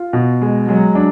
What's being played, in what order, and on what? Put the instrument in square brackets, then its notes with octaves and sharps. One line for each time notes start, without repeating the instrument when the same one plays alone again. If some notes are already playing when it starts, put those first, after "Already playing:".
Already playing: [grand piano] F4
B2
G#3
[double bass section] F#3 [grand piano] G#3
[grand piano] D4